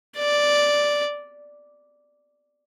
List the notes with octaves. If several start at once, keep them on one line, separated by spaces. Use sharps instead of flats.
D5